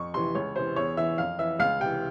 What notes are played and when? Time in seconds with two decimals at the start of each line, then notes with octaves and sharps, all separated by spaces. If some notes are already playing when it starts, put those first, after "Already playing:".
Already playing: F2 C#6
0.14 C3 E3 C6
0.35 C#2 C#5
0.56 C3 E3 C5
0.76 E2 C#5
0.97 E3 E5
1.18 F2 F5
1.39 E3 E5
1.59 C#2 F5
1.81 C3 E3 G5